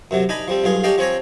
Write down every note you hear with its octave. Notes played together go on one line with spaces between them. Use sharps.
F#2 C3 F#3
D4 D#4 G#5 A#5 B5
F3 G3 C4
B1 G2 F4 G#4
C#4 D4 G4 D5 D#5 F5
F3 C4 C#5 G#5 A#5